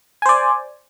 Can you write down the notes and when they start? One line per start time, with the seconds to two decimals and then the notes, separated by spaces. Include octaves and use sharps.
0.22 G#5
0.26 C5
0.29 D5